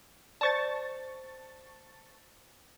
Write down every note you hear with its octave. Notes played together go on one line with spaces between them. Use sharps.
C5 D5 A5 C#6 A6